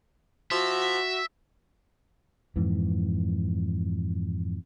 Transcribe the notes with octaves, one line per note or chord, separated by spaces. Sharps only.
F3 F#4 E5
F2 G#2 E3